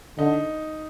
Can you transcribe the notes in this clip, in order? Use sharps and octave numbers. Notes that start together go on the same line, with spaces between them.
D3 D#4